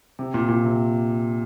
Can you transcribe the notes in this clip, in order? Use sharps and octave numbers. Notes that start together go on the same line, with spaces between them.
C3
A#2
A#2
C3